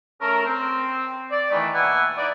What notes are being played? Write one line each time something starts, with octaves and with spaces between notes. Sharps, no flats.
A3 C#4 A4 A#4
C4
D5
D#3 E3 A3
B2 A#3 B4 E5 F#5 G#5
D#4 E4 B4 D5